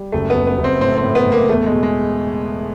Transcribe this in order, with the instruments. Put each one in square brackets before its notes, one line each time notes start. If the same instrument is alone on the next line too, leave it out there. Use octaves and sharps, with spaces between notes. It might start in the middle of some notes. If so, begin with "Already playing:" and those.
Already playing: [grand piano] G3
[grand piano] F#1 [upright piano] A3
[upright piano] B3
[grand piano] F#1
[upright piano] B3
[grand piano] F#1
[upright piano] C4
[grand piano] A2 [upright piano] C4
[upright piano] C4
[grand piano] A2
[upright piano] B3
[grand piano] A2
[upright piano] A#3
[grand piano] E2 [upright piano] A3
[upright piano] G#3
[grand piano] B2
[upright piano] G#3